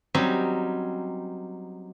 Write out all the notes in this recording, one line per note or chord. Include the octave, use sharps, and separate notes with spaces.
F#3 G3 C4 C#4 D#4